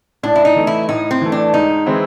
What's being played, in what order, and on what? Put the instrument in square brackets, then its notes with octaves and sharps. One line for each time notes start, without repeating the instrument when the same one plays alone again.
[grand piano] A2 [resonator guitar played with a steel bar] D4
[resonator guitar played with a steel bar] E4
D#4
[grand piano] E3 A3
[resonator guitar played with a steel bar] E4
[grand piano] A2 [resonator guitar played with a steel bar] D#4
[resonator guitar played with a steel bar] C4
[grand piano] E3 A3
[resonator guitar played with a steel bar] D4
[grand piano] G#2 [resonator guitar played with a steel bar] D#4
[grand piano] E3 G#3 C4 E4